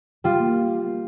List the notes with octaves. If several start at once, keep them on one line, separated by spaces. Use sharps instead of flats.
G3 F4
A#3